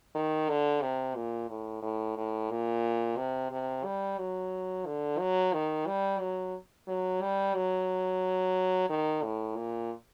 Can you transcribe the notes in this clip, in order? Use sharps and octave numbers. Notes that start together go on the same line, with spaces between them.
D#3
D3
C3
A#2
A2
A2
A2
A#2
C3
C3
G3
F#3
D3
F#3
D#3
G3
F#3
F#3
G3
F#3
D#3
A2
A#2